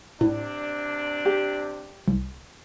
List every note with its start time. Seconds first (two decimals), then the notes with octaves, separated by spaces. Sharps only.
0.21 A2 C3 D4
1.25 G4
2.08 C2